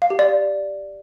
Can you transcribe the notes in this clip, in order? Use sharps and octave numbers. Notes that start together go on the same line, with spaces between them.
F5
G4
D5